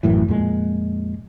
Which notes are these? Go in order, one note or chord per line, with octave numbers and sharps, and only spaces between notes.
A1 F#2 A2 E3
F2 A#2 G#3